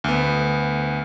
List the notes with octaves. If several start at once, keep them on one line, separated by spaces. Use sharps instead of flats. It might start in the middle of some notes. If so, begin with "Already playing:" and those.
D2 B3